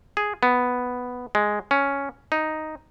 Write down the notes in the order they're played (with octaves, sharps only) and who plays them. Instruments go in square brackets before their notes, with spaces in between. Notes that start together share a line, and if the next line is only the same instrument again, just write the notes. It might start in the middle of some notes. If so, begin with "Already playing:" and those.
[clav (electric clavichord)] G#4
B3
G#3
C#4
D#4